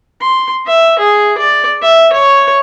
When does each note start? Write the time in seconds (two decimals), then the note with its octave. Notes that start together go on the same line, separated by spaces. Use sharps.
0.21 C6
0.67 E5
0.99 G#4
1.38 D5
1.82 E5
2.13 C#5